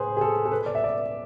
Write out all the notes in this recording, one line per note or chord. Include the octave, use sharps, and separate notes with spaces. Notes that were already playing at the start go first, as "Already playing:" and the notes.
Already playing: A2 G#4 B4 C5
G#4
A4
A4
B2 B4
D5
E5
D5